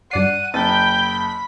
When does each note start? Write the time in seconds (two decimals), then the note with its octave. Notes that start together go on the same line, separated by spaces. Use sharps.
0.11 G2 D5 F#5 C7 D#7
0.54 F#1 G5 B5 A6